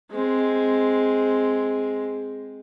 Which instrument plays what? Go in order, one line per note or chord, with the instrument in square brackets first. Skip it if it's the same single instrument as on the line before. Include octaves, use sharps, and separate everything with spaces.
[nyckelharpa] G#3 C4